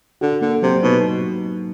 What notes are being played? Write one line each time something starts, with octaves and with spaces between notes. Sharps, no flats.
D3 F#4
D3 A#3
C3 F#3
B2 D#4